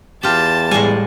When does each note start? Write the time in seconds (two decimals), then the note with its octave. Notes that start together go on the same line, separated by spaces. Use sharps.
0.23 E2 F4 G4 A5
0.71 A2 G3 G#3 G#5